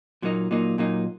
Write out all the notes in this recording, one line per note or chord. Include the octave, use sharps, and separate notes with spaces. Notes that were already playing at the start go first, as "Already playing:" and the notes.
A#2 F#3 A#3 D#4
A#2 F#3 A#3 D#4
A#2 F#3 A#3 D#4